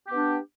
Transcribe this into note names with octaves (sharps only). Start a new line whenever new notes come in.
B3 D4 G4